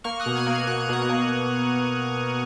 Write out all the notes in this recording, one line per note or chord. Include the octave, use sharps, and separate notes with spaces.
A#3 C#6 F6
D#6 F#6
B2
F6 G#6
A#3
F6 G#6
B2 F#6
G#6
B2 D#6 F#6
A#3